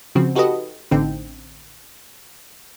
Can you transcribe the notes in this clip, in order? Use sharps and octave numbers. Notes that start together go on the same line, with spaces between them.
C#3 F3 C4 F#4
D#4 F#4 G4 A4 B4 D#5
A1 A2 D3 C4 D#4 G5